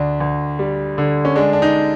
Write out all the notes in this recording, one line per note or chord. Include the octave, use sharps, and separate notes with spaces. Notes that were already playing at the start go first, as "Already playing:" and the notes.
Already playing: D2 D4
D2
G3
D3
C#4
G#3 D4
D4
D#4